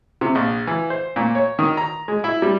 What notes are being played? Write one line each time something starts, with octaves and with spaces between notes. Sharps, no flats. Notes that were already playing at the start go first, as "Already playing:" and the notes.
C3
A#1
E3
C5
A#2
C#5
D#3
A#5
G#3
E4
G3